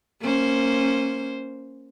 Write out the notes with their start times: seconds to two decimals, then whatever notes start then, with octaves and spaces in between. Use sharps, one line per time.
0.21 A#3 C#4 C5